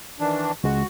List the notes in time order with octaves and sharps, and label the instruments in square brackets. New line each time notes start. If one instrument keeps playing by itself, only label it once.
[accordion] D#3 E3 D4
[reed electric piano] C#2 G#3 [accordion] F#4